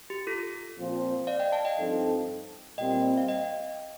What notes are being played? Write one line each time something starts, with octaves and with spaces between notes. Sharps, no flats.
G4
F4 A4
A#2 F3 C4 F4 C5
D5 F5
D#5 G5
F5 A5
D#5 G5
G2 F3 C4 D#4 A4
A#2 G3 C4 D#5 G5
F5
D#5 G5